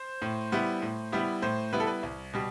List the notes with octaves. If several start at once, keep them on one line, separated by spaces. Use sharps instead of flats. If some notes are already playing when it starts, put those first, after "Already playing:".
Already playing: C5
A2
G3 B3 E4
A2
G3 B3 E4
A2 C5
G3 B3 E4 B4
A4
B4
C2
B2 G3